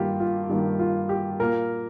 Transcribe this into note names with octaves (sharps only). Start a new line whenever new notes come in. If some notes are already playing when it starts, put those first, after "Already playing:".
Already playing: G2 D#3 A#3 F4 G4
F4
G2 D#3 A#3
F4
G4
A#2 A#3 A#4